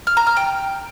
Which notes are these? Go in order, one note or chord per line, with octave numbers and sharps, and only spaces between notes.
F6
A#5
F6
G5